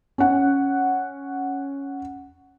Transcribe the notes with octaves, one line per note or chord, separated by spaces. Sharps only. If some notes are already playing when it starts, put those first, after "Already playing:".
C#4 F#5